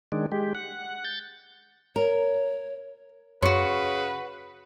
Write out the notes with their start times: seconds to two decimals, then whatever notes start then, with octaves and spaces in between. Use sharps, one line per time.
0.12 D#3 G#3 D4
0.32 G#3 G4
0.55 F#5
1.05 G6 A6
1.96 A#4 C#5
3.42 F#2 C#3 F#4 B4 C#5 C6 C#6